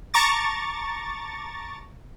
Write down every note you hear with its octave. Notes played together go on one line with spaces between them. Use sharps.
A5 A#5 C#6 D6 A6